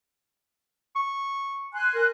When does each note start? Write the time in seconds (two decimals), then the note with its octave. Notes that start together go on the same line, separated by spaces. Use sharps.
0.96 C#6
1.73 G#5 C6 F#6
1.95 A#4